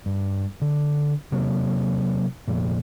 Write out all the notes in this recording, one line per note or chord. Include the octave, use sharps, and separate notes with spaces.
G2
D3
C3 F#3 A#3
F1 F2 A#2